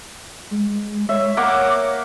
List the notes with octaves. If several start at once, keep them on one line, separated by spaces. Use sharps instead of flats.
G#3
C#5 E5
A#3 F#5 D6